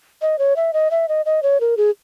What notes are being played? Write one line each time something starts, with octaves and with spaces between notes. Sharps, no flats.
D#5
C#5
E5
D#5
E5
D#5
D#5
C#5
A#4
G#4